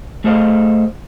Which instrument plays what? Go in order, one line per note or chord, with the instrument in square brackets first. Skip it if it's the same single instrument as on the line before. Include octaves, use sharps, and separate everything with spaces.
[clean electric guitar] A3 G#4 A4 C5 D#5 F5